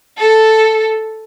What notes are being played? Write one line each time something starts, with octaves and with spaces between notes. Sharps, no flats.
A4